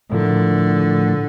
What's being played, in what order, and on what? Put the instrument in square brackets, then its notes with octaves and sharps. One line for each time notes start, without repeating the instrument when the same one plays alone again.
[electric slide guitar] A2 F3 A3 E4 A#4 [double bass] D3